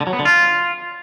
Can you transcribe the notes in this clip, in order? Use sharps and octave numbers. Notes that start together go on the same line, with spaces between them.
D3
F#3
B3
D3
F4